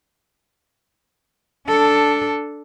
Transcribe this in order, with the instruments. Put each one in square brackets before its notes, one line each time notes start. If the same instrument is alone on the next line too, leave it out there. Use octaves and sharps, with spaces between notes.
[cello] D4 A4